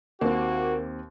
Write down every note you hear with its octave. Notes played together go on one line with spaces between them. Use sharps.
D#2 A#3 C4 F#4